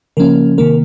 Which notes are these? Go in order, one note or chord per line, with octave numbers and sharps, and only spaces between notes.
C#3 F3 A#3 C#4 A#4
C3 D#3 A#3 A#4